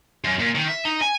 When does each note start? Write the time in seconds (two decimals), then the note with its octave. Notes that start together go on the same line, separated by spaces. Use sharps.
0.24 F#2
0.39 A#2
0.55 D#3
0.68 E5
0.85 D#4
1.01 G#5